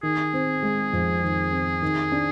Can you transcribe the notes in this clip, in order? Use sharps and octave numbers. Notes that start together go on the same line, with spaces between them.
D#3 G#4
C4
G#3
F2
D#3
C4
D#3
D4